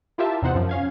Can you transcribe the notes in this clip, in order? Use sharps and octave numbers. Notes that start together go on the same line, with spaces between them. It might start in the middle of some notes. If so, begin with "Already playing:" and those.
E4 F4 G4 A#4 E5 A5
E2 C3 D#4 C5 F#5
F#2 F3
C#4 F5 G#6